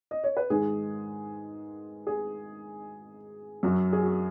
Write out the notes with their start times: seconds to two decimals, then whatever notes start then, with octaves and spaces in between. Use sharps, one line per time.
0.11 D#5
0.24 C#5
0.37 B4
0.50 G#2 D#3 G#3 G#4
2.07 G#4
3.63 F#2 F#3 F#4
3.93 G#4
4.02 F#4